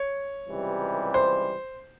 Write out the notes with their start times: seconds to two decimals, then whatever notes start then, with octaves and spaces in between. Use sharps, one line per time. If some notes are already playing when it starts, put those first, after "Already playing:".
Already playing: C#5
0.48 C#2 C3 E3 G3
1.14 C5